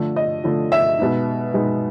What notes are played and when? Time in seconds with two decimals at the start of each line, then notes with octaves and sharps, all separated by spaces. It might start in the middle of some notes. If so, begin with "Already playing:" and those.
Already playing: D3 F3 A3
0.16 D#5
0.44 D3 F3 A3
0.72 E5
0.98 B2 G#3 B3 D#4
1.54 B2 G#3 B3 D#4